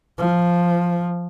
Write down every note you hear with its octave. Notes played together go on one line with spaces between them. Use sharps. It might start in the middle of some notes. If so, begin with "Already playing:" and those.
F3